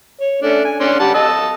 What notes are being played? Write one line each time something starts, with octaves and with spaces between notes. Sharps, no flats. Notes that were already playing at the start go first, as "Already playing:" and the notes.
C#5
A3 C#4 D4
G#5
C#4 D4 C6
G3 F#5 A5
D#5 A5 E6